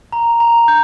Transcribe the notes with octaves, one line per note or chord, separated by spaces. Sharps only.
A#5
A#5
G6